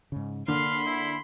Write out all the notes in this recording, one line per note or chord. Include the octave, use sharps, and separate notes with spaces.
G#2 C#3
D3 A#3 F5 B5 C6
E4